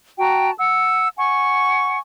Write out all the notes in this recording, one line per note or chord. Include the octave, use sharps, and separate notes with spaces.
F#4 G5 A5 A#5
F#5 E6
F#5 G#5 C#6